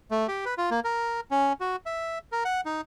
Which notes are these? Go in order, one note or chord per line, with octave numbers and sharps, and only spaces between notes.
A3
G4
B4
F4
A#3
A#4
C#4
F#4
E5
A#4
F#5
D#4